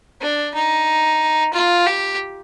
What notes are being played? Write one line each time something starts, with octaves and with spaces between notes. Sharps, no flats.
D4
D#4
F4
G4